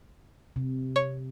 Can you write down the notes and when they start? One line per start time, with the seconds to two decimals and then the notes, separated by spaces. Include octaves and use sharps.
0.56 C3
0.96 C#5